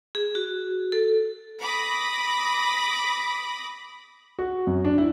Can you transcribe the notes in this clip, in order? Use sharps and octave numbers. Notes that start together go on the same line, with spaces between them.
G#4
F#4
A4
B5 D6 D#6 A#6
F#4
F#2
D4
E4